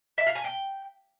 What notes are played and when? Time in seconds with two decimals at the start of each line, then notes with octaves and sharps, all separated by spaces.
0.18 E5
0.27 F5
0.35 G#5
0.44 G5